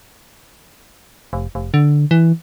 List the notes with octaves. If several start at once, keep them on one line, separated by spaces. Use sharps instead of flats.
F1
F1
D3
E3